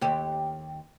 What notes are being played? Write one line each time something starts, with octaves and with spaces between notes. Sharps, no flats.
D#2 G4